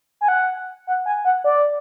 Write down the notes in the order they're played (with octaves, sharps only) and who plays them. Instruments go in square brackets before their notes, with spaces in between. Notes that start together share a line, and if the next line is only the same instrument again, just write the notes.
[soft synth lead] G#5
F#5
F#5
G#5
F#5
D5